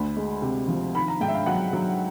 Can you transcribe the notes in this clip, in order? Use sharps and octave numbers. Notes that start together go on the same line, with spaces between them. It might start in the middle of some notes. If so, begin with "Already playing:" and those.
Already playing: D2 B5
G#3
C3
F3
D#3 B5
A#5
G#2 G5
E5
F5
F#3 F#5
F#3